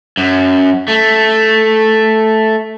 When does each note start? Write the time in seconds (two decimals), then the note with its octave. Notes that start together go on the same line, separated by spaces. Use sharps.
0.17 F#2
0.88 A3